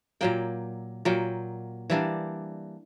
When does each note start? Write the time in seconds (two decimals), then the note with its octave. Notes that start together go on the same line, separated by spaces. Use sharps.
0.21 A#2 F#3 A#3 G5
1.05 A#2 F#3 A#3 G5
1.90 E3 G3 A#3 D4